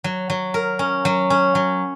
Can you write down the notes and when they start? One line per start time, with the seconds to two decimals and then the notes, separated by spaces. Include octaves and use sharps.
0.04 F#3
0.30 F#3
0.54 A#4
0.79 C#4
1.05 F#3
1.30 C#4
1.55 F#3